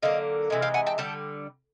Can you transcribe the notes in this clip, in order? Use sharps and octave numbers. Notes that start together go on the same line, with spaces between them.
D3 F#3 A#3 D#5 F5
C3 E3 G#3
F5 G5
F#5 G#5
G5 A5
D3 G3 G5 A5